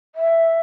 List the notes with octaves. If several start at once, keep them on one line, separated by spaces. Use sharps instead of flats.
E5